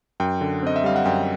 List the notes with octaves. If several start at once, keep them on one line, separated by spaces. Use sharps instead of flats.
F#2 G5
D3
C4 D#5
E5
G3 F5
F#5
F#2 G5